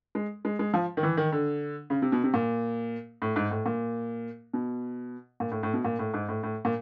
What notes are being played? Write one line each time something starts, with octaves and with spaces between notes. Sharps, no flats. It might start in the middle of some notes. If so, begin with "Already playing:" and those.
G#3
G#3
G#3
F3
D#3
E3
D#3
D3
C#3
C3
B2
C3
A#2
A2
G#2
A2
A#2
B2
A#2
A2
A2
B2
A#2
A2
G#2
A2
A2
A#2